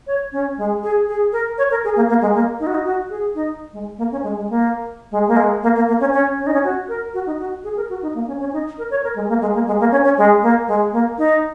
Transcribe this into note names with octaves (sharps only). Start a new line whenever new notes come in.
C#5
C#4
G#3
G#4
G#4
A#4
C#5
A#4
G#4
A#3
A#3
G#3
A#3
D#4
F#4
D#4
F#4
G#4
D#4
G#3
A#3
C#4
G#3
G#3
A#3
G#3
A#3
G#3
A#3
A#3
A#3
C#4
C#4
C#4
D#4
C#4
F#4
A#4
F#4
D#4
F#4
G#4
A#4
F#4
D#4
A#3
C#4
C#4
D#4
A#4
C#5
A#4
G#3
A#3
G#3
A#3
G#3
A#3
C#4
C#4
G#3
A#3
G#3
A#3
D#4